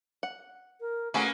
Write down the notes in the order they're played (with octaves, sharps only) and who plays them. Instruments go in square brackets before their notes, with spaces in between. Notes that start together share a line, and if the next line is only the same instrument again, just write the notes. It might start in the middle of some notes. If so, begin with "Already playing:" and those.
[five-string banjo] F#5
[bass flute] A#4
[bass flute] A3 [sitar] A#3 C#4 B4 [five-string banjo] F#4 G#4 E5